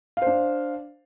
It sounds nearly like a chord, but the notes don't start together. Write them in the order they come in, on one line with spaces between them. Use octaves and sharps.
F5 C5 D4